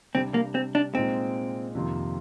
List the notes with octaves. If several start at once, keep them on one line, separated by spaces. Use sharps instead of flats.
C3 G3 C4 D4 G4
A#3
C4
D4
A#2 G#3 C4 D#4
F2 C3 D#3 A#3 F4